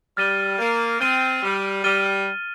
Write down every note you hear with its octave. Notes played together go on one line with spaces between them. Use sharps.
G3 F6 A6 D#7 G7
A#3
C4 F6 A6 D#7 G7
G3
G3 F6 A6 D#7 G7